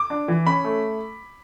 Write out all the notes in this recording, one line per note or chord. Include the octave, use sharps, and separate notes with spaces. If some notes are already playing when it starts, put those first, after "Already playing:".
Already playing: D6
D4
E3
C#4 B5
A3